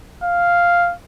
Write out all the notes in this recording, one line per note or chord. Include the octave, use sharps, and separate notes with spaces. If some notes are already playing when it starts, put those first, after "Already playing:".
F5